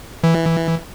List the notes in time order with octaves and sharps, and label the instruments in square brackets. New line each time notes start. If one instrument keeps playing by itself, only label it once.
[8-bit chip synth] E3